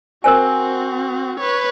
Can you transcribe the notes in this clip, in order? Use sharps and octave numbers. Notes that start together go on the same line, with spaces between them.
C4 F#4 A#4 C5 G#5
B4 C#5